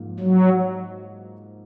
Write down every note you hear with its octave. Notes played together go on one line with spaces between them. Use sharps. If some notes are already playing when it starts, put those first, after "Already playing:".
Already playing: G#2 F3 A#3
F#3